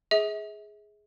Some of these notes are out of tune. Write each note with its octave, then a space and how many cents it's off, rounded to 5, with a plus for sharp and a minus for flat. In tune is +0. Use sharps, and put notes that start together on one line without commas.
G#4 +5 E5 -40